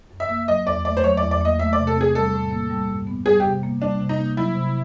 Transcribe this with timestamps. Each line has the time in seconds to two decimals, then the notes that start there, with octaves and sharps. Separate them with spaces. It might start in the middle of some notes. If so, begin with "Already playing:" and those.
0.11 F#2
0.20 E5
0.29 A#3
0.48 F#3 D#5
0.67 E2 D5
0.85 A3 D5
0.97 C5
1.04 F#3 C#5
1.17 D5
1.22 E2
1.31 D5
1.41 A#3 D#5
1.59 A3 E5
1.73 D5
1.78 C3
1.87 A4
1.96 C4
2.01 G#4
2.15 G3 A4
2.34 A2
2.51 A#3
2.70 G3
2.89 G2
3.07 B3
3.26 G3 G#4
3.40 G4
3.45 C3
3.63 A#3
3.81 G3 D4
4.00 C3
4.09 D#4
4.19 A#3
4.37 F#3 E4
4.55 C3